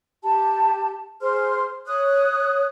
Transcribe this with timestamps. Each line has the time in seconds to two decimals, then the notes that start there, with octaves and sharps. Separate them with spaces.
0.23 G4 A5
1.21 G#4 C5 C6 F6
1.87 C#5 D#6 F#6